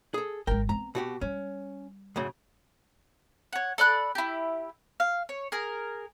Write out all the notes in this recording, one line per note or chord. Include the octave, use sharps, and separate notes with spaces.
G#4 A4
G#1 G#3 A#4 G5
B3 C4 A#5
B2 F#4 G4
G3 C#4
F#2 A2 C#3
C#5 F#5
A4 D5 B5 F#6
E4 G4
F5
C#5
G#4 A#4